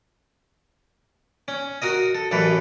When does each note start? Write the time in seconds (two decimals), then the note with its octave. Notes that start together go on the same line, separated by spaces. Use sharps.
1.48 C#4
1.82 F#4 A#4 D#5
2.15 A4
2.31 A1 F#2 E3 A4 B4